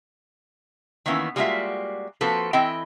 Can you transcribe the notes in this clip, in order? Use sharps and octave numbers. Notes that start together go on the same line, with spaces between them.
D#3 E3 A#3 B3 C#4 E4
G3 G#3 A#3 F4 F#4 E5
F3 A#3 C4 F#4 A4 B4
E3 C4 E4 D#5 G5